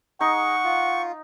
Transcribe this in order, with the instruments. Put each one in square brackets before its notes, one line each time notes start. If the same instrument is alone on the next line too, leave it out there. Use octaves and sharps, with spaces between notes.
[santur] D#4 [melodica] G#4 [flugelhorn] F#5 [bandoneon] C#6
[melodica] F4